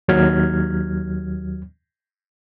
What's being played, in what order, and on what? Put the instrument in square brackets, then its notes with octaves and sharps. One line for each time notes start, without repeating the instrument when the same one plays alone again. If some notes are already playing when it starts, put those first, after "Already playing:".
[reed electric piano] D#2 F#3 F6 G#6